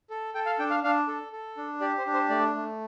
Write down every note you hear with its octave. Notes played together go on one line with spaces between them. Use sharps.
A4
A4 G5
F5
D4 G5
F5
D4 F5
A4
A4
D4
G4 D5
C5
D4
C5
A3 D5
A3